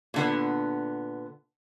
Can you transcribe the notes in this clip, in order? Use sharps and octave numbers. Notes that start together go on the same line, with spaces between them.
A#2 D3 B3